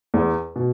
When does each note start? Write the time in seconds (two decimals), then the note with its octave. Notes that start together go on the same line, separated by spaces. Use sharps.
0.14 E2
0.56 B2